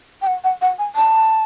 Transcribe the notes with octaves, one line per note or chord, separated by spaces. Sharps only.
G5
F#5
F#5
F#5
G#5
A5